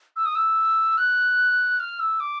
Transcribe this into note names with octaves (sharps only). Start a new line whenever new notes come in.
E6
D#6
E6
F#6
F6
E6
D6